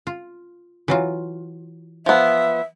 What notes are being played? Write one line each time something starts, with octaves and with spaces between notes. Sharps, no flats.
F4
E3 F#3 F4
F3 B3 E5